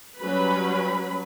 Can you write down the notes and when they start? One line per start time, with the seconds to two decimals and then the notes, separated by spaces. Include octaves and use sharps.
0.19 F#3 G3 C#4 B4 B5